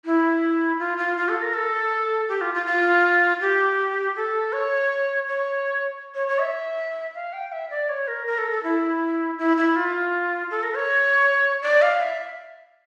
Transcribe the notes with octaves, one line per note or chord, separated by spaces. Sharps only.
E4
F4
F4
F4
A4
A#4
A4
G4
F4
F4
F4
G4
A4
C#5
C#5
C#5
C#5
E5
F5
G5
E5
D5
C#5
A#4
A#4
A4
A4
E4
E4
E4
F4
A4
A#4
C#5
D5
F5
E5